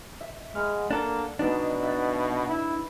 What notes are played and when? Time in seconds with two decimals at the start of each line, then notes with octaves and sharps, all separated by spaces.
0.20 E5
0.55 G#3 F#5 B5 F6
0.91 A#3 D4 A4
1.39 B2 B3 D4 D#4
1.83 E5 F#6 A6
2.48 E4